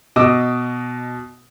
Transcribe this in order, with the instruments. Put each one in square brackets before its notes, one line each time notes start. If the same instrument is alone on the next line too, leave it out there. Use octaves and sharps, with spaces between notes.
[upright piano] B2 D#5 D6 E6